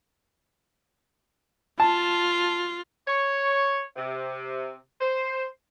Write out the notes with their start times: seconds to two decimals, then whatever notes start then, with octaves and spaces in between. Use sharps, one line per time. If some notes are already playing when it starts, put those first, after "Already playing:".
1.80 F4 A5
3.07 C#5
3.96 C3
5.00 C5